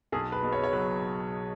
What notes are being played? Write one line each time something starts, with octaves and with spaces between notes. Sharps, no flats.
B1 G#4
B4
B2
C#5
C#5
F#3 B4